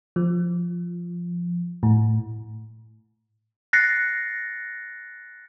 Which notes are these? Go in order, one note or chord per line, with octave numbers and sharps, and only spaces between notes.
F3
A2
F#6 A6 A#6 C7 C#7